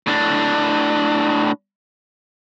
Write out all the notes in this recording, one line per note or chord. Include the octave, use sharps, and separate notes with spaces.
A2 D4